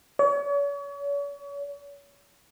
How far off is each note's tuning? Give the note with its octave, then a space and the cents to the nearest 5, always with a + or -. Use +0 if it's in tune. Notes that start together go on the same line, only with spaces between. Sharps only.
C#5 +40